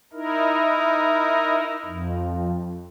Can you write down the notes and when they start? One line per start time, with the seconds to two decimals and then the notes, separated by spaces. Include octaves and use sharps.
0.13 D#4 E4 A#4
1.85 F2